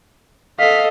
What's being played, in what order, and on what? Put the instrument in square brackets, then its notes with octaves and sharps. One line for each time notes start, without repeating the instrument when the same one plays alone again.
[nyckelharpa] A4 D#5 [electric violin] F5 [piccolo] B6